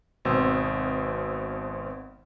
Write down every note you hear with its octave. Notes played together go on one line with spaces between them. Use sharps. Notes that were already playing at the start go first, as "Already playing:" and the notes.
G#1 B2 C4 C5 E6